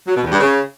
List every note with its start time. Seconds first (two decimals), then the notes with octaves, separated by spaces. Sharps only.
0.07 F#3
0.16 B2
0.24 E2
0.32 G2
0.40 C#3